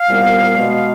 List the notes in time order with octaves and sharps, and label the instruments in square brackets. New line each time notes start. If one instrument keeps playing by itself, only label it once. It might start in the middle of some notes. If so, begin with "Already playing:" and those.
Already playing: [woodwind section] F5
C2 A#2 G3 B3
B2 G#3 B3